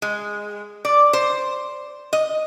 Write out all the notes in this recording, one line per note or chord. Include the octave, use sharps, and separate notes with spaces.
G#3
D5
C5
D#5